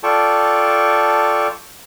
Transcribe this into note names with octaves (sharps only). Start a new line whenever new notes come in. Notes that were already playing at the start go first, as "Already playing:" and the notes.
F4 A4 D5 G5 A5 C#6